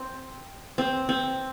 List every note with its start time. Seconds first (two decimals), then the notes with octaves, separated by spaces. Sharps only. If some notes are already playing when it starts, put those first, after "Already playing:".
Already playing: C4
0.78 C4
1.09 C4